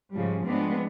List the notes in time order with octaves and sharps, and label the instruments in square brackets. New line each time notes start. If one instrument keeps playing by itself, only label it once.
[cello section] G#2 C#3 F3 G3
F3 G#3 B3 C4 D4